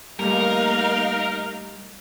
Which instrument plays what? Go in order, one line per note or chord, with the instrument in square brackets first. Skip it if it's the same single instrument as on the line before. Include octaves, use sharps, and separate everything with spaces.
[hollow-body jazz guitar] G3 A3 [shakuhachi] A#3 [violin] D#4 F5 [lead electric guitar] A#4